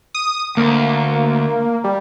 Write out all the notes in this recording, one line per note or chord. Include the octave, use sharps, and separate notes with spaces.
D#6
D2 A#3
G3